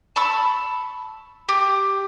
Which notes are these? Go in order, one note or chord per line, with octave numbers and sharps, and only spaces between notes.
A5 B5 C#6 E6
G4